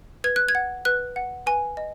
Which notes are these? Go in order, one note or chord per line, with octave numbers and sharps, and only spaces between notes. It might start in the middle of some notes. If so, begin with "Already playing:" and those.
B4 G#6
F#6
G#6
F#5
B4 F#6
F#5
B4 G#5
D#5